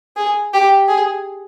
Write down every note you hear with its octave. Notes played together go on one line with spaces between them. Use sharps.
G#4
G4
G#4